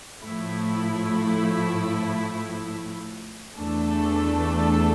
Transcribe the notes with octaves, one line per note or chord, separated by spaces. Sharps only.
A2 F3 A3 E4
E2 E3 A3 D4 A4